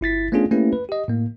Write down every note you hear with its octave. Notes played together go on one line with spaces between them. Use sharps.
G1 E4 A6 B6
A3 B3 C#4 D4 F4 G#4
A3 A#3 C#4 E4 G4 B4
B4
G4 D#5
A2 A#3